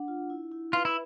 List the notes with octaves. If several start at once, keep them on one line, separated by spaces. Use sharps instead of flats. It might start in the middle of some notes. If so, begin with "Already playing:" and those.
Already playing: D4 F#5
F4
E4
E4
F4 B4
E4